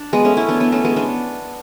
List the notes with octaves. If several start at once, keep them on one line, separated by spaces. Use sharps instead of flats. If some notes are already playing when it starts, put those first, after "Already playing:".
Already playing: D4
G#3 B3
A3 C#4
C#4 E4
B3 D4
B3 D4
A3 C#4
G#3 B3
B3 D4